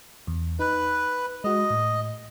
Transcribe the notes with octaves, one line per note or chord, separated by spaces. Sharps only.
E2
D#4 B4 F#6
G#3 F#4 D#5
A2